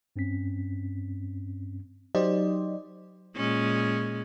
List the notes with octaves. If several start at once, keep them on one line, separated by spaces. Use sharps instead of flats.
G2 C4 C#4 B6
F#3 D#4 G4 C5 D5 D#5
A#2 G#3 C#4